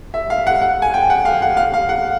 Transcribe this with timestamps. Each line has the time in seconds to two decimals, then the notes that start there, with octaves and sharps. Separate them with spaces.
0.14 E5
0.30 F5
0.47 F#5
0.62 F#5
0.82 G#5
0.94 G5
1.10 F#5
1.25 F5
1.42 F#5
1.57 F5
1.74 F5
1.89 F#5